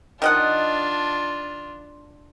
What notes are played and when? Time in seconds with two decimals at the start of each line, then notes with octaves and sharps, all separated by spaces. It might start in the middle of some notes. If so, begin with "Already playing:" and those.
0.22 D#3 D4 F4 D#5 F#5